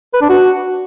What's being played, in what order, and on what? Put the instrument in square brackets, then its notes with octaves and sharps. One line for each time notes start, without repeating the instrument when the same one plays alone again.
[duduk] B4
D4
F#4